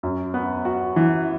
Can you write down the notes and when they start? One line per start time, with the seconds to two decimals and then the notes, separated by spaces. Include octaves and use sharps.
0.03 F#2
0.34 B3
0.65 F#4
0.96 E3